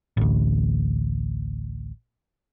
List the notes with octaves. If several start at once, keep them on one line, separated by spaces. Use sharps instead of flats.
A1 D2